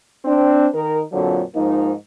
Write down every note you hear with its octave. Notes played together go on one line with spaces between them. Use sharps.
C4 D4
D#3 A#4
F2 A#2 D3 F3 F#3
G#2 F3 A#3 D#4